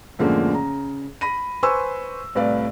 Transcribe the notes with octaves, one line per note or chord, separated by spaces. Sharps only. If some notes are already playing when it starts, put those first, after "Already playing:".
F#2 A2 D3 F3 G#3 A#3
C#3 A#5
B5 A#6 D#7
B4 C5 G#5 C6 C#6 E6
C2 A2 B4 D5 F5